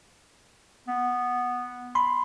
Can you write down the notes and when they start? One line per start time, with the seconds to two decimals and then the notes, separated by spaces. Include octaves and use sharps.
0.88 B3
1.95 B5 C6